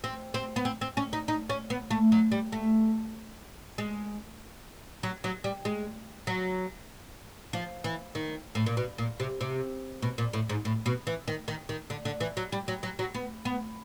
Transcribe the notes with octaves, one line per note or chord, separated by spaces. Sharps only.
C4
C4
B3
C4
C4
C#4
D#4
D#4
C#4
B3
A3
F#3
G3
A3
G#3
F#3
F#3
G3
G#3
F#3
F3
E3
D#3
A2
A#2
B2
A#2
C3
C3
B2
A#2
A2
G#2
A2
B2
E3
D#3
D#3
D#3
D3
D3
E3
F#3
G3
F#3
F#3
F#3
B3
B3